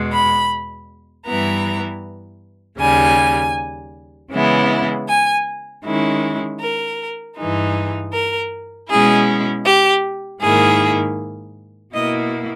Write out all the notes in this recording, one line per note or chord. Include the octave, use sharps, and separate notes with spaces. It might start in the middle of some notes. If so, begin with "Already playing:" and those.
Already playing: E2 B2 G#3
B5
G2 E3 G3 B3 E4 A#5
D#2 C#3 G3 G#5
C#3 E3 G#3 B3 E4
G#5
D#3 G#3 C#4 E4
A#4
G2 E3 G#3 D#4
A#4
B2 G#3 C#4 E4 G#4
G4
G#2 D#3 A#3 E4 G#4
B2 A#3 E4 D#5